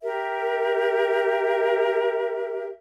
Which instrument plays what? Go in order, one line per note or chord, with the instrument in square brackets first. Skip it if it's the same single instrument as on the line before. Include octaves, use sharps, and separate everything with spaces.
[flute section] G4 A#4 E5